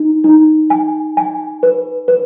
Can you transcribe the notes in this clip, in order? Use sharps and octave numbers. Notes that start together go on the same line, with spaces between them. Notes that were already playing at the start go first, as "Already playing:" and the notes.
Already playing: D#4
D#4
G#5
G#5
B4
B4